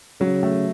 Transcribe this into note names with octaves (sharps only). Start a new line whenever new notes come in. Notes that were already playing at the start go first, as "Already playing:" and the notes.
C#3 F#3
A3